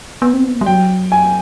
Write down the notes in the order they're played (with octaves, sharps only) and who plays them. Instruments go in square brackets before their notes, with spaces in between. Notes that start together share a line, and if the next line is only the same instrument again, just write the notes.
[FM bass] B3
C4
B3
A#3
G3
[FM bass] F#3 [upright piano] G5
[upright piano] G#5